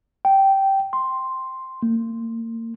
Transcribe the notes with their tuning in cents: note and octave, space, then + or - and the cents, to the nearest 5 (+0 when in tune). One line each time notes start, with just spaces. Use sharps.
G5 -10
C6 +0
A#3 -35